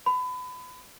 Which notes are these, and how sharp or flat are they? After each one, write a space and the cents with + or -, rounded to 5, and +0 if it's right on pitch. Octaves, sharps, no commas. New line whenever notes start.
B5 +30